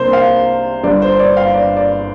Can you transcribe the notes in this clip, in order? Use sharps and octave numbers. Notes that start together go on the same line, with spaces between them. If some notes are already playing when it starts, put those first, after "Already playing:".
Already playing: C2 C3 A#3 D4 C5
F5
G1 G2 D3 D5
C5
D5
F5
D5
D5